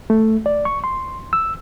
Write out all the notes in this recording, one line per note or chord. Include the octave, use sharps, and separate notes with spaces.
A3
D5
C#6
C6
E6